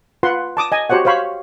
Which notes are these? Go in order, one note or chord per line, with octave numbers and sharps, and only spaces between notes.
F4 B4 F#5 C6
A5 D6 D#6
D#5 G#5
F#4 G4 C5 C#5 F#5
C5 C#5 F5 B5 C#6